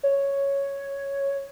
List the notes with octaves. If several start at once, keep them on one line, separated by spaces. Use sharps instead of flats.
C#5